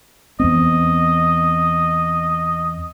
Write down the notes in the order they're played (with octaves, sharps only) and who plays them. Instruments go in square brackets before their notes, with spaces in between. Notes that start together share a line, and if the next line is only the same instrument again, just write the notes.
[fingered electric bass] E2 B3 C4 [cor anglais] D#5